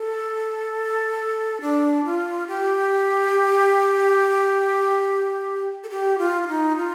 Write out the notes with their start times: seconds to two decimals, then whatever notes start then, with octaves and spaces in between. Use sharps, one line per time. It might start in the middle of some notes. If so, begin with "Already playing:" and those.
Already playing: A4
1.61 D4
2.05 F4
2.48 G4
5.84 A4
5.90 G4
6.18 F4
6.43 F4
6.47 D#4
6.77 F4